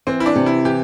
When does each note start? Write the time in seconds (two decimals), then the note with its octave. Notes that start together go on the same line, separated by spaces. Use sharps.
0.07 E3 C4
0.20 E4
0.26 D4
0.36 C3
0.46 E4
0.65 E3 G4